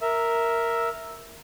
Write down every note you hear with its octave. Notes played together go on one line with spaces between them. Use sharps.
A#4 E5